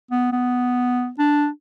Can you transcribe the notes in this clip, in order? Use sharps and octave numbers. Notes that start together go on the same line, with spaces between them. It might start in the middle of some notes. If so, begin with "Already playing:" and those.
B3
B3
D4